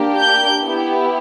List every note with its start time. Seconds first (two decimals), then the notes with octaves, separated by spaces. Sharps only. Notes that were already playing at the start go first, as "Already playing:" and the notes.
Already playing: A#3 D4 G4
0.19 G6
0.62 B3 E4 G4